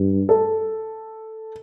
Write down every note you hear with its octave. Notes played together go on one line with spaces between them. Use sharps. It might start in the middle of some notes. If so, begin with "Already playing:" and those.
Already playing: G2
A4